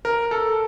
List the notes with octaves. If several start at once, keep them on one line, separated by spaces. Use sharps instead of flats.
A#4
A4